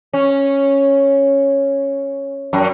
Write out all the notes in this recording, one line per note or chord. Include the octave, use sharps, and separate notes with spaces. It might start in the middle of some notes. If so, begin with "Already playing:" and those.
C#4
F#2